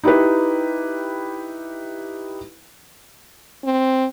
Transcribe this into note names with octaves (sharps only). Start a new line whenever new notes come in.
D#4 E4 G4 B4
C4